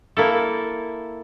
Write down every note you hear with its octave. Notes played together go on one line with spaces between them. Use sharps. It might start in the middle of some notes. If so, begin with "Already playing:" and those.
A#3 E4 A4